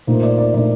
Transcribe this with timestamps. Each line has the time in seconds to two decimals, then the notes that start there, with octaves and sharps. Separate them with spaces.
0.07 A#2 A3 D#4 C5
0.23 D5
0.38 D5
0.54 A#2 A3 D#4 D5